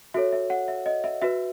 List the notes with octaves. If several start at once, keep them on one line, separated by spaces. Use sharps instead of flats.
F#4 A4 C#5 E5
E5
F#5
E5
D#5
E5
F#4 B4 E5